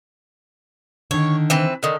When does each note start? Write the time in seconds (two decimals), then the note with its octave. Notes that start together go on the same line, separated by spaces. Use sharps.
1.11 D3 D#3 C#5
1.50 E3 C4 B4
1.83 D3 D#3